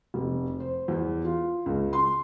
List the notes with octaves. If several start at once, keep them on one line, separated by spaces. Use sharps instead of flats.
F1
C5
E2
F4
C#2
C6